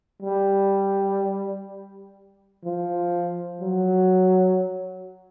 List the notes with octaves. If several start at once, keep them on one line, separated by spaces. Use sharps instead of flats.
G3
F3
F#3